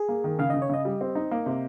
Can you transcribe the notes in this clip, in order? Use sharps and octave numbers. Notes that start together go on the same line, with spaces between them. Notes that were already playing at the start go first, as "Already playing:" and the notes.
Already playing: G#4
A#3
D#3
C#3 F5
C#3 D#5
C#5
C#3 D#5
G3
C4
D#4
A#3
C3